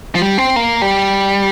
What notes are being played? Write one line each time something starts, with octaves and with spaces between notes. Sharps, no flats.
F3
G3
C4
A#3
G3